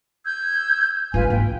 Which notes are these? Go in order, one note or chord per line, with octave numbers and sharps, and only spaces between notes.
E6 G6 G#6
G#2 D#3 F4 B4 G#5
A#3 G5